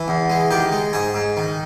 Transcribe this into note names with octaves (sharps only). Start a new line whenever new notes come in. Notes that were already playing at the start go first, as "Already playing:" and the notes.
Already playing: E3
E2
G#3
D#3 G4
G#3
G#2 G#4
G#2
D#3